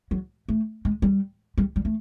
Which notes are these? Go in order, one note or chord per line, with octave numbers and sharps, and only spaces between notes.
F#3
A3
G#3
G3
G3
G3
A3